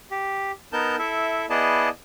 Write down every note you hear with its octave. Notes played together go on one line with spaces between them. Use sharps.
G4
B3 D#4 A#4 A5 G6
E4 A4 E5
B3 E4 G#4 D5 D#5 A5